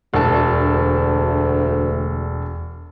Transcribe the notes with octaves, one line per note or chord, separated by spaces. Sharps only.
E1 D2 A5